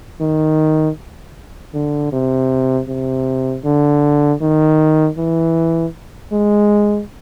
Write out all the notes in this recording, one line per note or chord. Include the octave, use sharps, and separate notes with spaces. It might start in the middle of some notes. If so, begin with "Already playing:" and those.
D#3
D3
C3
C3
D3
D#3
E3
G#3